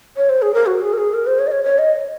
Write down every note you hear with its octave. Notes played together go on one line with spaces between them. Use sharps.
C#5
C5
G#4
A#4
F#4
G#4
A#4
G#4
A#4
C5
C#5
D#5
C#5
C#5
D#5